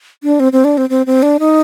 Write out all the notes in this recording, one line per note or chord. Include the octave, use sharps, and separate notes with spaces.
D4
C4
C4
D4
C4
C4
C4
D4
D#4